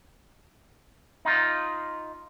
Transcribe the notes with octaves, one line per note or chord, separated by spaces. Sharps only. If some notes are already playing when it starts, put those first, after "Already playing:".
D#4 F4